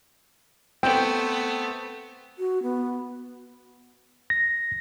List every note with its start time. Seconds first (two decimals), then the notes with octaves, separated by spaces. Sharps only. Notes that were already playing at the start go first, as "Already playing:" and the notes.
0.83 A3 B3 C4 G5
2.39 F#4
2.63 B3
4.30 A#6